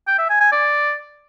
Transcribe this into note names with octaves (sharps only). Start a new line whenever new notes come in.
G5
E5
G#5
G#5
D5